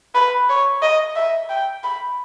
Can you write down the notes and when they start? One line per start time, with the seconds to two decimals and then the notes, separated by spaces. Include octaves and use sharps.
0.15 B4
0.49 C#5
0.82 D#5
1.16 E5
1.49 G5
1.84 B5